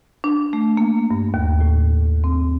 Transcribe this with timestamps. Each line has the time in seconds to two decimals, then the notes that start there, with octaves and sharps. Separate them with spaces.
0.24 D4
0.53 A3
0.77 A#3
1.11 G2
1.34 D#2
1.61 A2
2.24 C4